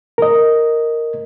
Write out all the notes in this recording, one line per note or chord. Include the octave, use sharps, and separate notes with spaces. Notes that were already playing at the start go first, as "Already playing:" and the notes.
A#4 D#5